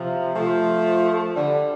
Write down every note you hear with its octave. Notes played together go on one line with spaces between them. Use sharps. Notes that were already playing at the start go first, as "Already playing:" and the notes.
Already playing: C3 F3
F3 A3
D3 G3